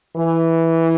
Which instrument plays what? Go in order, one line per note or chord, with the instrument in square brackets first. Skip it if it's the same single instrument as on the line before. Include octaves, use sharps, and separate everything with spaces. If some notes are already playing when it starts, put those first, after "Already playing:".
[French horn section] E3